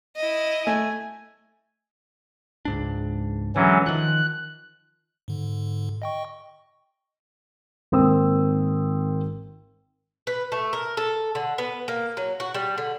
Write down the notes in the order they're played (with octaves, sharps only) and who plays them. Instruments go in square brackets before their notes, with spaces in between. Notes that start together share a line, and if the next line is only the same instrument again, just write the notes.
[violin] E4 D#5
[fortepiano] A3 [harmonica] G#5
[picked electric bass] C#2 G#2 D4
[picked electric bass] D3 G#3 [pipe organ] E3 F#3 C#4
[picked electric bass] D#3 F3 [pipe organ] F#6
[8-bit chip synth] G#2 D3
D#5 G5 C#6
[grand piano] G#1 A#3 C4 G5 D#6 E6
[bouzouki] B4
A3
A#4
A4
D3
B3
A#3
F#3
F#4
G3
D3